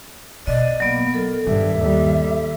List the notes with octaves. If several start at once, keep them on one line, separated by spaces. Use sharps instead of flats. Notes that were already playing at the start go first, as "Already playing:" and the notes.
B2 D5 D#5
F#3 A#3 B3
A4 A#4
G2 D#3 E5
D#2 G3